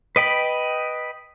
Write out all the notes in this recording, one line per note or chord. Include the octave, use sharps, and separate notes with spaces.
B4 D#5 G5 B5